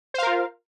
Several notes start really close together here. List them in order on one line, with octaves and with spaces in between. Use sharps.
C5 F5 A#4 F4